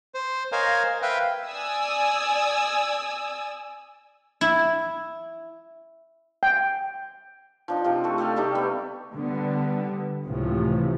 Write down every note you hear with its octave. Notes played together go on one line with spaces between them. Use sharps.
C5
A#4 C5 C#5 D#5 F5 G#5
B4 E5 F5 G5
D5 G#5 D#6 E6
E4
G5
F3 D4 D#4
C3 F4 G4
A3 F#4 A4
A3 G4 A4 F5
C3 G3 A3 D#4
B3
D3 G3 B3
C#2 A2 C3 E3 F3